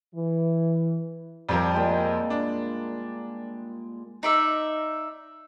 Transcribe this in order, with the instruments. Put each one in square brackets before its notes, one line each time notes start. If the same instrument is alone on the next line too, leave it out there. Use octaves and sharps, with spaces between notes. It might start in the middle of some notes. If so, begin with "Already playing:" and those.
[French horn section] E3
[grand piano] F2 F3 A#4 [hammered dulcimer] G3 G4
[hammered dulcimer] A#2 G#3 G5
[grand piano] D4
[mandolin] D#4 D5 E5